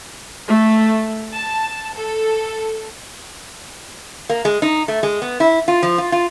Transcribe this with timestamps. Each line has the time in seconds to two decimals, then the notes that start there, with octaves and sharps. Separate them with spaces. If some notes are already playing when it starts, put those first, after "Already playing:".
0.47 A3
1.34 A5
1.95 A4
4.30 A#3
4.45 G#3
4.62 D#4
4.88 A3
5.03 G#3
5.22 B3
5.40 E4
5.68 F4
5.83 F3
5.98 F4
6.12 F4